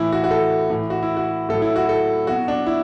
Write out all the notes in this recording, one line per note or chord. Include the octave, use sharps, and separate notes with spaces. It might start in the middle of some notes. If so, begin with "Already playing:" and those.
Already playing: A2 E3 E4
F#4
F#4
A4
A2 E3
F#4
E4
F#4
A2 F#3 A4
E4
F#4
A4
B2 F#3 F#4
D4
E4